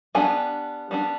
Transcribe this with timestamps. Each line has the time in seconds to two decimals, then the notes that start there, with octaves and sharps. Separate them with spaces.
0.15 G3 B3 D4 G#5
0.91 G3 B3 D4